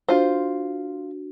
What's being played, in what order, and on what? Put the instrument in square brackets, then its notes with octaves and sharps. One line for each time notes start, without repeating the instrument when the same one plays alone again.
[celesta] D4 F#4 [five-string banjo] F4 C5